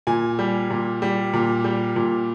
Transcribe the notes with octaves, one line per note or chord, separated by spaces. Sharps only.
A#2 G#5
G3
A#2
G3
A#2
G3
A#2